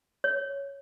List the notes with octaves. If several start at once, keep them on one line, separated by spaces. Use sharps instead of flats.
C#5